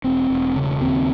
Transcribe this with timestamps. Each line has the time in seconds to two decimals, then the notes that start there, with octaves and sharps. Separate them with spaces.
0.04 E1 C4
0.30 E1
0.56 C#3
0.81 D#2 C4